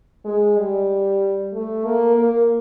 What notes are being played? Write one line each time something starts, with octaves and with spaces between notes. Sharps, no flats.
G#3
G3
A3
A#3
A#3